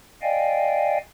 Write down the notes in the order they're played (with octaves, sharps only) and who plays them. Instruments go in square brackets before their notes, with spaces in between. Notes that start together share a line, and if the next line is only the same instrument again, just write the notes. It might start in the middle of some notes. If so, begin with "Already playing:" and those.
[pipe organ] D5 D#5 F5 G5 G#5